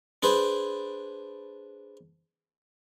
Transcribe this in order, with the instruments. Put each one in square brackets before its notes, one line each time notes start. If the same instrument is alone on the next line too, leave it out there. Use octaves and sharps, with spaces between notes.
[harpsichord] D4 G#4 B4 C5